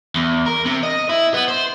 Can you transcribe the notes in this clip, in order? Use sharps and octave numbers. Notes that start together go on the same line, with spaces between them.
E2
A#4
C3
D#5
E4
B3
C5